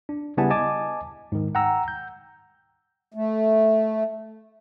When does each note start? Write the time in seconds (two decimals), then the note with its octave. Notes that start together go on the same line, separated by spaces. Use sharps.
0.09 D4
0.37 C#3 G3 B3 E4 G#5 A5
0.50 D#5 G#5 A5 D6
1.32 G#2 D#3
1.55 F#5 G5 A#5 E6
1.88 G6
3.14 A3